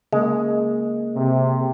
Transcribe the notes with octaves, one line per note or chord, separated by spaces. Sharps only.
C#3 G#3 A#3
C3